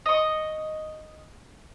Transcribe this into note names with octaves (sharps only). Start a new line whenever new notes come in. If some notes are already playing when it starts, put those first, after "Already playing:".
D#5 C#6